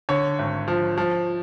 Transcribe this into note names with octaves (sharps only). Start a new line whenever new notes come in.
D3 C#5
G#1
F3
F3